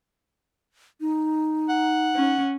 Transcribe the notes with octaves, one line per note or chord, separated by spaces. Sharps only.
D#4
F#5
C#4